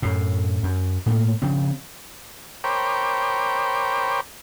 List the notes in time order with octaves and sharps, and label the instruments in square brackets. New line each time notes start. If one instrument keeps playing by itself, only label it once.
[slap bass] F#2 A2
F#2
A2 A3 A#3
C#3 F3 C4
[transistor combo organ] A#4 C5 C#5 G5 B5 D6